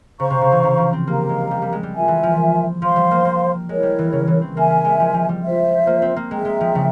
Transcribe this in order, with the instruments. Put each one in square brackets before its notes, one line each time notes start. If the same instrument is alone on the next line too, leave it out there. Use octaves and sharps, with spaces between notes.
[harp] C#3 [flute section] C5 F5 A#5 C#6
[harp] C3
C#3
E3
C#3
F3
C4
[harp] A#3 [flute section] G4 A#4 F5 A#5
[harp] G#3
G3
G3
G#3
G3
[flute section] F4 A#4 E5 G#5
[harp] E3
F3
[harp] F3 [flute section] C5 F5 C6
[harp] G3
A#3
A#3
[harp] G#3 [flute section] E4 A#4 C#5
[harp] G3
E3
C#3
E3
C4
[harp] A#3 [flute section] A#4 E5 G#5
[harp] A#3
G#3
F3
F3
G3
[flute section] F4 C5 E5
[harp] A#3
C4
A#3
[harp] G#3 [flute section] G#4 E5 G5 A#5
[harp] G#3
F3
C#3